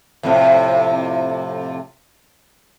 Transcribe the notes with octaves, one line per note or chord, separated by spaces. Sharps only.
F2 A2 C3